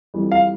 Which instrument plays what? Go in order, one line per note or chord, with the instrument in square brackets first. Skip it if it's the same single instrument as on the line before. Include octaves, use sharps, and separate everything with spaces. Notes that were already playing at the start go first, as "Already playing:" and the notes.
[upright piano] F2 E3 G3
F5